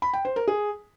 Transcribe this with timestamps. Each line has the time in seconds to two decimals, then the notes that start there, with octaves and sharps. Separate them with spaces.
0.02 B5
0.13 G5
0.25 C5
0.36 A#4
0.48 G#4